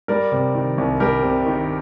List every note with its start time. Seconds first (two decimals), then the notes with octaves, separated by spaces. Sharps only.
0.08 G3 A#4 D5
0.32 C3
0.55 D#3
0.78 C2
1.00 G3 G4 A#4
1.23 C3
1.46 D#3